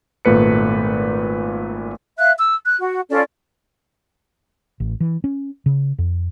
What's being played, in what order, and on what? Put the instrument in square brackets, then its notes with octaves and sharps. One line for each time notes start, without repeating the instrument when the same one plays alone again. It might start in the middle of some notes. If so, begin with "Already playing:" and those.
[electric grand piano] G#1 A#2 A3 B4 C#7
[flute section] E5 F5 F#6
E6
F#6
F#4
C#4 F4 A4 D5
[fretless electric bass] A1
E3
C#4
C#3
F2